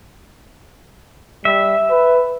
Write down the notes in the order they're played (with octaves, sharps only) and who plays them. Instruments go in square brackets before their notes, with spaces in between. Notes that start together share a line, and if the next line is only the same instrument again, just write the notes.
[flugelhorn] G3 [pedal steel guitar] E5
[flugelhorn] B4